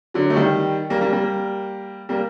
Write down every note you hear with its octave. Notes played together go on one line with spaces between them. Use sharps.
D3 F#3
A3
D#3 G3
G3 A#3
G3 A#3
G3 A#3
G3 A#3